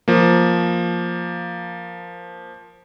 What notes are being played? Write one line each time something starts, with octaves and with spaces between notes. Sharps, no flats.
F3 A#3